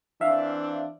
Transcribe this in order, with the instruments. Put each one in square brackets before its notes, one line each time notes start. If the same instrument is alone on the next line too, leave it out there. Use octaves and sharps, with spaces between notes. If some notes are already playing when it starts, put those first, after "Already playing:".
[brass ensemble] E3 C4 D4 [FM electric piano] E5 F5